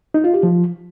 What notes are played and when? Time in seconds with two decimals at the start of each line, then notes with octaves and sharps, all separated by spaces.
0.14 D#4
0.24 F4
0.34 G4
0.43 F3